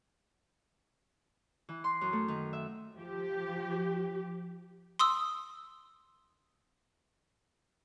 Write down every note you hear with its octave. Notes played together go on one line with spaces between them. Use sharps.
E3
C6
F#2
A3
D#3
E5
F3 G4
C6 D#6 E6